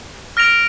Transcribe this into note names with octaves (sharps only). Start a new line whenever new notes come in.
F6 A#6 D7 F7